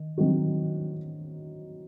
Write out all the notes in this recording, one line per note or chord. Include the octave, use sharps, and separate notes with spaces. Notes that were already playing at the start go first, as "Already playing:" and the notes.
Already playing: D#3
D#3 F#3 C4 D#4 F#4